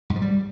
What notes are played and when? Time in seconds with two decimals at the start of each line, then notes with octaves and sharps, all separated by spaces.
0.10 G#2
0.16 F3
0.22 G3